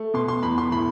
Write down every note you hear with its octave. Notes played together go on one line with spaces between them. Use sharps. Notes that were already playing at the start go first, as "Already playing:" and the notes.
Already playing: A3
B2 C6
C6
E2 B5
C6
A2 B5